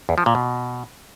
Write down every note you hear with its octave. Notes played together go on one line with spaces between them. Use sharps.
E2
F3
A#2
B2